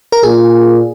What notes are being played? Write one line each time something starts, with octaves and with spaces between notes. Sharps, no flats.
A#4
A#2 G#4